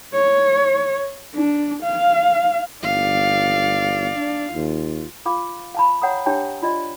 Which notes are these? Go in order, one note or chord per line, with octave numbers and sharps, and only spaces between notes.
C#5
D4
F5
G1 D5 F5
D4
D#2 F4
F4 F5 D6
F5 A5 B5
C#5 F#5 G5 A#5 D#6
D4 G4 C#5 E5 G5 A5
F4 D5 D#5 C6